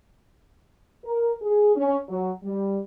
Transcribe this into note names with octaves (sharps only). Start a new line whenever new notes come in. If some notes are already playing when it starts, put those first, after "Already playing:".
A#4
G#4
C#4
F#3
G3